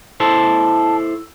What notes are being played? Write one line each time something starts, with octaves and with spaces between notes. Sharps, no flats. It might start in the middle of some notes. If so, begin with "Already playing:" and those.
E4 A4 C5 A5